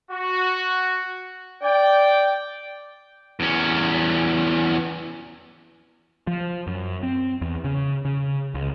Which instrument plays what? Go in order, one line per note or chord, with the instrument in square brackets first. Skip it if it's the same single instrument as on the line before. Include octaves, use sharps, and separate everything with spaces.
[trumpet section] F#4
[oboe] D5 [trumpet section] G5
[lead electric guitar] E2 C#4
[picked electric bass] F3
F#2
C4
E2
C#3
C#3
C#2